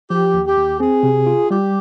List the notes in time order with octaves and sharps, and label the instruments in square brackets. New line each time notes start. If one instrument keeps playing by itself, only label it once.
[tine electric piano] F3 [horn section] G4
[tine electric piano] D#2
[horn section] G4
[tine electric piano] D#2
[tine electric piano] C4 [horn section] G#4
[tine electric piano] C3
F4
[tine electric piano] G3 [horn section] G4